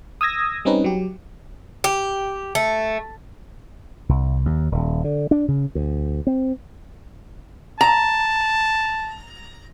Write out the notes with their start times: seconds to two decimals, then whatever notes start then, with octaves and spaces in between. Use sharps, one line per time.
0.21 D#6 E6 G#6 A#6
0.65 G3 C4 C#4 D#4 B4
0.84 F#3 G4
1.84 G4
2.55 A3
4.09 C2
4.46 D#2
4.72 D#1
5.04 D3
5.31 D4
5.48 C#3
5.75 D2
6.27 C4
7.81 A5 A#5